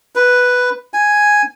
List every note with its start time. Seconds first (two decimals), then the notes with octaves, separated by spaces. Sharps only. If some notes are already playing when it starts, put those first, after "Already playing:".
0.15 B4
0.94 G#5